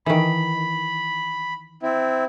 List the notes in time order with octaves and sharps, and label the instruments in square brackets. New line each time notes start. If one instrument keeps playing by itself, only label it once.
[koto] D#3 E3 [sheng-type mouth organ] B5
[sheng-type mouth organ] C4 E4